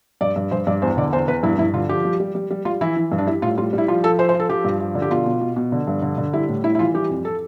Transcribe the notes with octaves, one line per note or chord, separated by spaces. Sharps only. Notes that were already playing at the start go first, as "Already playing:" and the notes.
G2 D5
G2
G2 C5
G2 D5
E2 C5
D3 D5
E2 C5
E2 B4
G2 E4
G2 E4
D3 F4
F3 G4
G3
G3
G3
G3
G3 F4
E3 E4
E3
G2
D4
G3 E4
A2 F4
G3 F4
G3
E4
F3 F4
F3 A4
F3 C5
C5
F3
A4
F3 G4
G2
F3
D3
G4
B2 F4
B2
B2
B2
D3
G2
D3
D3
G3 E4
A2
G3 E4
E4
E3 F4
G3 G4
F2
A4